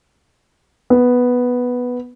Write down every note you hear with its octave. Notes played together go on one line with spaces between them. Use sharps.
B3